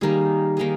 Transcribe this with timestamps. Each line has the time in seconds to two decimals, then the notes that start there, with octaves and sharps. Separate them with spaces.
0.01 D#3 G3 A#3 D#4 G#4
0.57 D#3 A#3 D#4 G#4